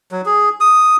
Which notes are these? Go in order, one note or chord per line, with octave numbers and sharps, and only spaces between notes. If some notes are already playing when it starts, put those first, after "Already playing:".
F#3
G#4
D#6